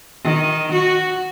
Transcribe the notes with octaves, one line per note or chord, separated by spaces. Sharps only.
D#3
F#4